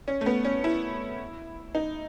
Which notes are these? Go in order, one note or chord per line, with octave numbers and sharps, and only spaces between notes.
C#4
A3
B3
C#4
E4
D#4